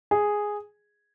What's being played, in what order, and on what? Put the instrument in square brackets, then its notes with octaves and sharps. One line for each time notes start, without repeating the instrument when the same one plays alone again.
[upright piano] G#4